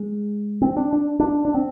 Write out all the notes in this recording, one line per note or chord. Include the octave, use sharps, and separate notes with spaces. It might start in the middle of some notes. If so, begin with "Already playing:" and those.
Already playing: G#3
C4
D4
D4
D4
D4
C4